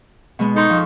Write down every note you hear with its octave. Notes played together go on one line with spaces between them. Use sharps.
B2 G#3 B3
D#4 A4 C6 C#6
F2